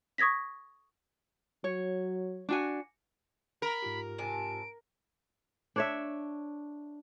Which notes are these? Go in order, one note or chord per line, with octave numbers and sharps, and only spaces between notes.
C#6 D#6 G#6 A#6 B6
F#3 C#5
D4 F#4 G#5
A#4 B5
G#2 F4 G4
C3 G#5 A5 D7
D4 C#5 E5